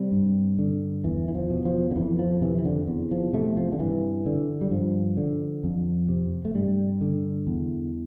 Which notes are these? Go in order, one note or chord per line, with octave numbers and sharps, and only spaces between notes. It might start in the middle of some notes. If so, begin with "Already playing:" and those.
Already playing: C3 G3
G2
D3
E2 E3
E3
F3
B2
F3
D3
F2 E3
F3
C3 E3
E3
D3
E2
F3
C3 A3
F3
D3
G2 E3
D3
G3
G2 F3
D3
F2
C3
A3
G2 G3
D3
E2